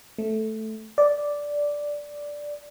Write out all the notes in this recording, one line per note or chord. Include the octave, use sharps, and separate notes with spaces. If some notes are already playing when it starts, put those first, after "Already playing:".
A3
D5